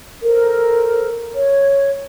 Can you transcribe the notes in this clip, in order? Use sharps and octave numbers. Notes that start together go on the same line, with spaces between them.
A4 A#4 C5
C#5